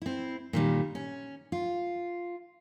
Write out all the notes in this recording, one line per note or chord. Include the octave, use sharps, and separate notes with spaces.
C4 E4
A#2 D#3 G3
C#4
F4